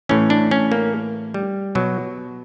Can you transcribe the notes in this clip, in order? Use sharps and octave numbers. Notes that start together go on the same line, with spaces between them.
A2 E3 C#4
D4
C#4
A#3
G3
B2 F#3